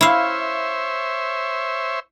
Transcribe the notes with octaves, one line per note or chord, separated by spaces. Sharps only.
E4 C5 C#5 E5 F5